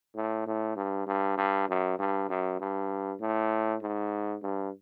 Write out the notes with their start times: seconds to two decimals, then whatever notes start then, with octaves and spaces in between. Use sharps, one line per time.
0.16 A2
0.47 A2
0.76 G2
1.07 G2
1.38 G2
1.69 F#2
1.99 G2
2.29 F#2
2.60 G2
3.21 A2
3.82 G#2
4.43 G2